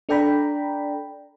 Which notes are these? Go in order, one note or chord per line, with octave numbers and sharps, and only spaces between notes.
D4 A4 D5 G5 A#5 B5